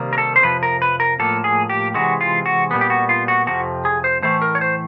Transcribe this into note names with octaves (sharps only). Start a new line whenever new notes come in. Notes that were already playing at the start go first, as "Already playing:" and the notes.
Already playing: C3 D#3 G3 A#3
A#4
A4
C5
F2 C3 F3 B4
A#4
B4
A#4
A2 F3 A#3 A4
G#4
G4
C3 E3 G#3 F#4
F4
F#4
A#2 G3 B3
G4
F#4
F4
F#4
F2 C3 F3 F#4
G#4
C5
A2 E3 A3 C5
A#4
C#5
C5